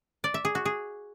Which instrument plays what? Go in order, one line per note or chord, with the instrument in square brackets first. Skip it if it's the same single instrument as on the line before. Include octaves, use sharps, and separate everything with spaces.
[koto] D5
E5
G#4
F#4
G#4